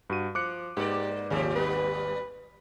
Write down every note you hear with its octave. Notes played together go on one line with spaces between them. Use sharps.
G2 F#4 D#7
F3 D6 F#6 C#7
G#2 A#3 G4 D5
G#1 D#2 A2 C#3 F3 G4
G3 B3 B4